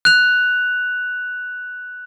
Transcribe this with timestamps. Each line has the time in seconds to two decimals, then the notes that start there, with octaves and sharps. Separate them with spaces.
0.05 F#6 F7